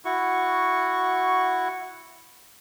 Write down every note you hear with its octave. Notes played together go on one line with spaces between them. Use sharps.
E4 F#4 C#6